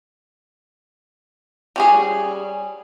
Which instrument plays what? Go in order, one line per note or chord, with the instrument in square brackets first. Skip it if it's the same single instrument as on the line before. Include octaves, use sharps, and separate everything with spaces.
[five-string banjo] G3 C#4 G#4